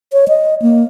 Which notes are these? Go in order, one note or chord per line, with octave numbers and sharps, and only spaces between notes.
C#5
D#5
A#3